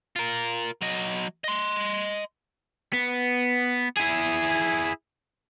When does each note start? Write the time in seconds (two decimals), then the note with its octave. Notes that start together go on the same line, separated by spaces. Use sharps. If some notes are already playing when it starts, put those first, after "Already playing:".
0.16 F4 A#4
0.82 F#3 D#5
1.44 D#5 C6
2.93 B3
3.97 E4 G#4